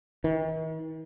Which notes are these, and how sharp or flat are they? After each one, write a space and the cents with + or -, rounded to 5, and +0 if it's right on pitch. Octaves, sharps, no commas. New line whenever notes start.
D#3 +45